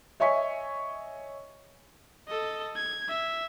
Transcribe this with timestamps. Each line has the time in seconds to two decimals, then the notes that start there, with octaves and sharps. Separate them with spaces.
0.20 C#5 D#5 E5 G#5 C#6 B6
2.28 A4 D#5
2.76 G#6
3.08 E5